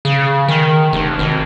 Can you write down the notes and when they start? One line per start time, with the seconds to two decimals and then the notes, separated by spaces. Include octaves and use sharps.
0.05 C#3
0.48 D#3
0.93 F1
1.19 G#1